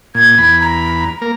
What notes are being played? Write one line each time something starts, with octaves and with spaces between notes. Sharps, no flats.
A#2 G#6
E2 B5
A#5
A#3 A#4